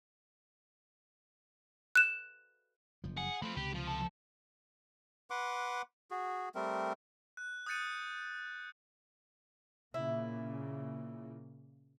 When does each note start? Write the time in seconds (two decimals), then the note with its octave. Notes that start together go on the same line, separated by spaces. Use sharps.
1.95 F#6 E7
3.04 F#1 F3
3.18 G#4 F#5
3.42 F3 A3 C4 B4
3.57 C#2 C3 G4
3.74 F3
3.87 A3 A4
5.30 B4 F#5 C6 D6
6.11 F#4 G#4
6.55 G3 A3 C4 A#4
7.37 F#6
7.66 D#6 F#6 G6 A6 C#7 D#7
9.94 A#2 C#3 A#3 E4